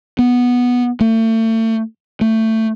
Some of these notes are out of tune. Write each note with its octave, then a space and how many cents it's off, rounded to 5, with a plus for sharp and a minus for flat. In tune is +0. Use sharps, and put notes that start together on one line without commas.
B3 -5
A3 +35
A3 +15